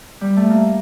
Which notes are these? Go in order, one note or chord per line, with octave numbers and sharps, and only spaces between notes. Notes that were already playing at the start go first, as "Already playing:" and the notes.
G3
A3
A#3